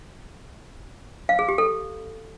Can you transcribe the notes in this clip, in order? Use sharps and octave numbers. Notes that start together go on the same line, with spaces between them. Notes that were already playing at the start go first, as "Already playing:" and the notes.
F5
G#4
G4
A4